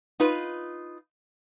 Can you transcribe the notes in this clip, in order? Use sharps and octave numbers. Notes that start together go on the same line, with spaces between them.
D#4 F4 B4